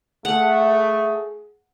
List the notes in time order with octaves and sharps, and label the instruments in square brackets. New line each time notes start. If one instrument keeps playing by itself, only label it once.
[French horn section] A3 [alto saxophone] G#4 [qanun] F#5